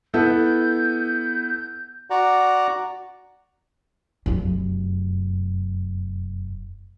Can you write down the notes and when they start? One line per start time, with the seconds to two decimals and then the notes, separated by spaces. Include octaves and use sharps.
0.14 B3 E4 A4 G6
2.10 F#4 D5 F#5 A#5
4.26 F1 F#2